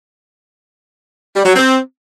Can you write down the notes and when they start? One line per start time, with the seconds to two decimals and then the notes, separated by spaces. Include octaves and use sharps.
1.34 G3
1.45 F#3
1.56 C4